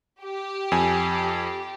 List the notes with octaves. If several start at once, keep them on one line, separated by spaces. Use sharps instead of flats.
G4
F2 G#5